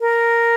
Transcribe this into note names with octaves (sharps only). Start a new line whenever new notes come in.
A#4